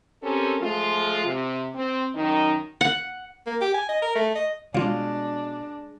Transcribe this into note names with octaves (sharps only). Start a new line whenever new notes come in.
C4 C#4 G4 A4 A#4
F3 G#3 A3 F4
C3
C4
F#2 D#3 D#4
F#5
A#3
G4
G#5
D#5
A#4
A3
D#5
B2 G#3 D4 F4 C#5 F5